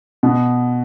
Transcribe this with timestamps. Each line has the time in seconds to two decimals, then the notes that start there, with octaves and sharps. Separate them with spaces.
0.23 B2